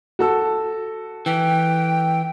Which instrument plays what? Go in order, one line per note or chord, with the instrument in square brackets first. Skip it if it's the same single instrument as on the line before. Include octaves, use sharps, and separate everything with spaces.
[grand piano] F#4 A4 E6
[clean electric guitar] E3 [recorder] G5